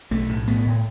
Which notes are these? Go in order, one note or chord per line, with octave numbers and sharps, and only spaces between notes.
B1 A3
A2
A2 B3
A2